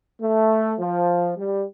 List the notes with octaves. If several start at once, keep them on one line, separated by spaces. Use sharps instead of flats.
A3
F3
G3